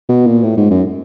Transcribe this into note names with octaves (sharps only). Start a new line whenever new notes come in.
B2
A#2
A2
G#2
F#2